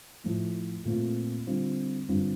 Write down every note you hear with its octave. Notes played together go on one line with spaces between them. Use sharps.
A2 F3 A3
A#2 A3 C4 F4
D3 G3 C4 F4
G2 D3 G3 C4 F4